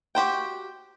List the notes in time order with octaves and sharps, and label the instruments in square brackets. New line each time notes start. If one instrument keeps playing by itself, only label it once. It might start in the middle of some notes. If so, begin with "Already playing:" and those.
[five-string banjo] F#4 G4 C5 G5